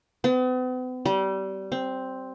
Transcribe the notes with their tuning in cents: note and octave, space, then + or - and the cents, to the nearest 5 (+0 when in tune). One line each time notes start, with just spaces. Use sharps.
B3 +45
G3 -25
C4 +0